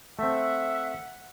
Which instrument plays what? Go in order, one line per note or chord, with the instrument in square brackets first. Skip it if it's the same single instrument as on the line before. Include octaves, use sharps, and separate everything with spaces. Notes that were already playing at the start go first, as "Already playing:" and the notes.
[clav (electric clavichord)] A3 C4 [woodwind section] E5 [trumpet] F#5